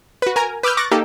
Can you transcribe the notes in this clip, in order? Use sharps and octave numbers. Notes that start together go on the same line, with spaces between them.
F#4 B4
A#4 G#5 A#5
B4 D6 E6 F6 G6
C#6 D6 F#6 A6 A#6
A#3 D#4 G4 A4